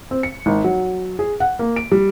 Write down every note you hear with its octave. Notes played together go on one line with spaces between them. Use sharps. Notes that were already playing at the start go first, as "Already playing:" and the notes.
C4
C#7
G#1
F#3
G#4
F#5
A#3
D7
G3